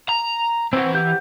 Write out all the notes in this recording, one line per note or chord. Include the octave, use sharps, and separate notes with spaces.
A#5
E3 C4 F#4
G4 F#5 G6